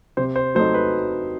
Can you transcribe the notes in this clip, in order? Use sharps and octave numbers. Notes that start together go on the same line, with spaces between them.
C3 C5
C5
F#3 A3 C4 D#4 C5
B4